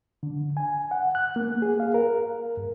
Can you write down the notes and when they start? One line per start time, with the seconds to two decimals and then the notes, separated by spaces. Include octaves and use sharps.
0.23 D3
0.57 G#5
0.91 F#5
1.15 F#6
1.36 A#3
1.62 G#4
1.80 F5
1.94 A#4
2.57 G2